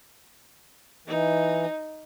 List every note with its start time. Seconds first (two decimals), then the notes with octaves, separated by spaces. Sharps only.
1.08 E3 D#4